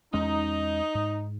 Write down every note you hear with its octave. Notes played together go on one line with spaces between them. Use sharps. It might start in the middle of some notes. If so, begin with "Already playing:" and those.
E2 G#3 C#4 D#4
G#2